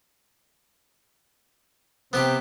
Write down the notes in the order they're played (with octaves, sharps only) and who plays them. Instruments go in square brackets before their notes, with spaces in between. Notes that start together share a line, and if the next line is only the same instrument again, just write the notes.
[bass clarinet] C3 [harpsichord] B3 G4 G5 [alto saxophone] C4